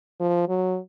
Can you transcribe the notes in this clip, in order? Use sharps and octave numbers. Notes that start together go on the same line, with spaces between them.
F3
F#3